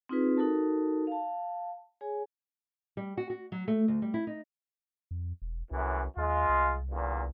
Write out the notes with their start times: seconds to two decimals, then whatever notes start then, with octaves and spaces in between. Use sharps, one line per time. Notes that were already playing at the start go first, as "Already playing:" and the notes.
0.09 C4 D#4 F4 G#4 B4
0.37 D#4 F#4 A4 A#4 A5
1.07 F5 A5
2.01 G#4 C#5 G#5
2.97 G3
3.17 F#4
3.30 F#4
3.52 F#3
3.68 A3
3.88 D2
4.02 G3
4.14 E4
4.27 D#4
5.11 F2
5.42 E1
5.71 C2 F#2 A2 E3
6.17 D#2 G#3 F4
6.49 C2
6.90 E2 G2 A#2